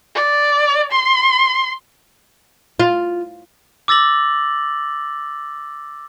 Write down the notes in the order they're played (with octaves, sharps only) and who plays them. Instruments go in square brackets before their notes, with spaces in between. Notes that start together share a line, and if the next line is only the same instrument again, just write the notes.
[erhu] D5
C6
[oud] F4
[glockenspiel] D6 E6 A6 A#6 F#7